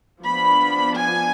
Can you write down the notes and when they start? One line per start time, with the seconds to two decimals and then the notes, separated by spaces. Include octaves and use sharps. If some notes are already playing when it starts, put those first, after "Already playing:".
0.24 F3 B3 D4 B5
0.97 G#5